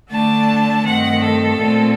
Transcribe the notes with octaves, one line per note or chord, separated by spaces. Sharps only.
D3 A3 D4 A5
G2 D#3 A3 C4 F#5
A4
A#2 A3 C4